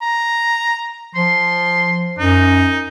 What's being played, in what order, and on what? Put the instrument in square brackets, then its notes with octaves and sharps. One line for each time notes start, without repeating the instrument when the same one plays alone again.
[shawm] A#5
[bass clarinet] F3 [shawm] C6
[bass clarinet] F#2 [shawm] D#4